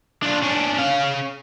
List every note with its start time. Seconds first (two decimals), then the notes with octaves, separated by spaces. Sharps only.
0.22 D4 F4
0.42 C#4 D4
0.79 C#4 F5